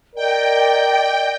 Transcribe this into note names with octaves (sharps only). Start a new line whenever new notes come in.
A#4 D5 D#5 G5